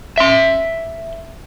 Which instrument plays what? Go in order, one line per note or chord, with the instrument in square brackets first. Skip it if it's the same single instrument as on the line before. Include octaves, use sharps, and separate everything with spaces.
[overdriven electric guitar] E5 C6